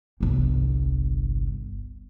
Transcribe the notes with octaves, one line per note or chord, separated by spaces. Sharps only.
G1 C2